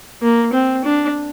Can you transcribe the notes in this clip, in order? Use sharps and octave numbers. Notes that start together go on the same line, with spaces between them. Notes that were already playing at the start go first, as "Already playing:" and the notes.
A#3
C4
D4